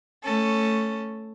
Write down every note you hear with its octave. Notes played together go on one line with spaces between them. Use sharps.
A3 C#4 A4